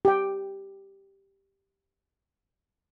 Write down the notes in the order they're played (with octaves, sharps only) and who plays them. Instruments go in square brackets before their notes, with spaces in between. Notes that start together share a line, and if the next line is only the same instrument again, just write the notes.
[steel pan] G4 G5